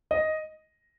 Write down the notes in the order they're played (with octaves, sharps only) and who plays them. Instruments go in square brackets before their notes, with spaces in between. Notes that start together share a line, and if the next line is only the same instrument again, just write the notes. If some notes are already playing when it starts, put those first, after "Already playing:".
[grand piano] D#5